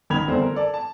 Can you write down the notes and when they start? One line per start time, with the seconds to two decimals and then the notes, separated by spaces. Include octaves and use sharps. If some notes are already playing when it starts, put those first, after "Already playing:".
0.10 A1 D#3 B5 G#6 F7
0.27 E2 D3 G3 A3 C4 C5
0.42 A#4
0.54 A4 D5 A5
0.74 A5